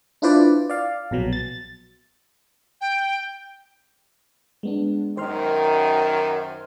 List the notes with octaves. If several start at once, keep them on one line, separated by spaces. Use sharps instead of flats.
D4 E4 F4 B4 C5 D5
D5 F5
A#1 B2 F#3
A6
G5
G#3 B3 D4
F#2 D#3 C5 C6 F6